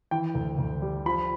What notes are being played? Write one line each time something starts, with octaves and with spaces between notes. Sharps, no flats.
E3 G5
D2
D2
G3
F3 B5